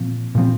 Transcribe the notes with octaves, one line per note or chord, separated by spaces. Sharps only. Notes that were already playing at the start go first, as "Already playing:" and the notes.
Already playing: A#2 F3 C4
A#2 F3 C4